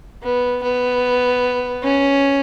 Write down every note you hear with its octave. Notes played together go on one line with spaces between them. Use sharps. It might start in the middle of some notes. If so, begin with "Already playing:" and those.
B3
B3
C#4